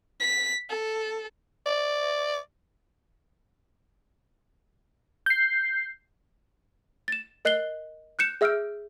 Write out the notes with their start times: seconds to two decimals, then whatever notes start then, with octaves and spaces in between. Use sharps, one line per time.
0.20 B6
0.70 A4
1.66 D5
5.26 G6 C7
7.08 A6 E7
7.45 A#4 D#5 F#6 C7 F#7 G7
8.19 F#6 G6 C#7 E7
8.41 G#4 E5 E6 F6 G6 D7